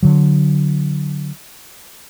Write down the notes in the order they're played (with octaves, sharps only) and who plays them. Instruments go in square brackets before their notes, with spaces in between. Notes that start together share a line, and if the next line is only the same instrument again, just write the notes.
[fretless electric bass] D3 F#3